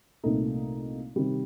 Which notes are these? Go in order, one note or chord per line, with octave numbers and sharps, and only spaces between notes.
C2 A#2 A3 D#4
C3 D#3 G3